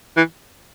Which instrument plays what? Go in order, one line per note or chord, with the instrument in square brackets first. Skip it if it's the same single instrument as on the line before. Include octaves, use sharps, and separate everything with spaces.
[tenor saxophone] E3